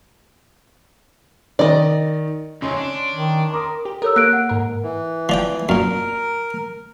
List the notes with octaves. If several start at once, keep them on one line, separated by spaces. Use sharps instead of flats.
D#3 D5 D#5
C#3 C4 C#4 D#4 C6
D4
D#3
A#4 C6 D6 D#6
G4
A4 A#4 C#5 E6
A#3 F#6 D7
F#5
G#2 A#4
E3
F3 D5 G5
F#2 A#2 A#4